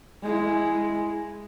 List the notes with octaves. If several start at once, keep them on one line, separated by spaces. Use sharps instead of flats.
G#3 E4